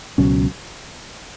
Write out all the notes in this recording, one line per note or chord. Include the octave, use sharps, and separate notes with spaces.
C#2 B2 F#3 C#4